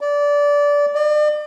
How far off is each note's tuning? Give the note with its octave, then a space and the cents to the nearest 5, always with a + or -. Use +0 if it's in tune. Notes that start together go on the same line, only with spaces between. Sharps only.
D5 -20
D5 +40